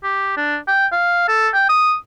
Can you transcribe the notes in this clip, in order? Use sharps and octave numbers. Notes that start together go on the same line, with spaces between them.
G4
D4
G5
F5
A4
G5
D#6